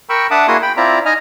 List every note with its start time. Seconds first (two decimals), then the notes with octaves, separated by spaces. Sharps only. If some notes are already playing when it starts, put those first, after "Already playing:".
0.09 A#4 G5 B5 C#6 E6
0.31 D4 E5 F#5 A5 D6 D#6
0.48 A#3 E4 F#4 G#4 C6 D#6
0.62 G5 B5
0.77 C4 E4 F4 D5 E5 A#5
1.05 D#4 D#5 G#5 A#5 F6